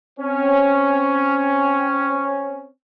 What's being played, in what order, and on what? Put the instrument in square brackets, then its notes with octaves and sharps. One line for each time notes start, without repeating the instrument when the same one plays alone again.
[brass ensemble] C4 C#4